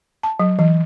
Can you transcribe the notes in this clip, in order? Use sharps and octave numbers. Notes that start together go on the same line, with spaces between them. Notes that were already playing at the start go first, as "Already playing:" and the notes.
A5
F#3
E3